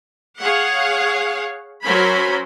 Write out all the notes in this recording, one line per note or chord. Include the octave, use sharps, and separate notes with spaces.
G#4 C#5 F5 F#5
F#3 C#4 A#4 C5 B5